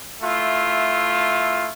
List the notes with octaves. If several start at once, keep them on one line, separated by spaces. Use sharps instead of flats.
A3 E4 F4